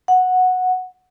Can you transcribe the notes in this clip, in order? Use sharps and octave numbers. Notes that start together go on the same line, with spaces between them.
F#5